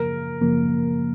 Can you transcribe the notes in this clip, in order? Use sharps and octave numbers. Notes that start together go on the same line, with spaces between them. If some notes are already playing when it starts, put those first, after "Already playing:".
Already playing: F#2 C#3 F3 A#3 A#4
F#2 C#3 F3 A#3